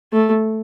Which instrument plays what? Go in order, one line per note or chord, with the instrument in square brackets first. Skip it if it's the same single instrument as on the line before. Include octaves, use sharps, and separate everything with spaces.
[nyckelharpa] A3